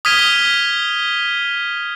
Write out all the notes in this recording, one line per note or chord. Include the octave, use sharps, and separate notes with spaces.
D#6 F6 G#6 B6 D#7 G7